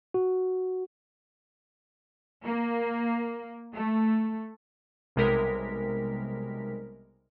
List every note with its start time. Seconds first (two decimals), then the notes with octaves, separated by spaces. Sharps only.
0.14 F#4
2.44 A#3
3.75 A3
5.16 B1 C3 G3 G#3 A#4 B6